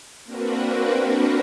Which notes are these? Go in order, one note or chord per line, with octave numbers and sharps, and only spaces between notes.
A#3 C4 D4 F#4 A#4 B4